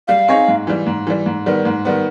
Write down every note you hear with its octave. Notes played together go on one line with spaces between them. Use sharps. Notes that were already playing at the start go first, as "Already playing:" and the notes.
G3 F5
C4 D#4 G#4 C#5
G#2
E3 G3
G#2
E3 G3
G#2
D#3 G3 B3
G#2
D#3 G3 B3